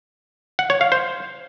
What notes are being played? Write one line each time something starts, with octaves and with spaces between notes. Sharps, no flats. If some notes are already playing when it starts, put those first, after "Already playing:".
F#5
C#5
F5
C5